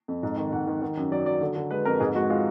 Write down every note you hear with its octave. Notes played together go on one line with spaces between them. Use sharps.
F2
G#2
D#3
G#2 F#5
D#3
D#3
F#2
F#3 D5
F#3 D5
D3
D3
G#3 B4
F2 A#4
G#2 G#4
G#3 F#4
G#3 F4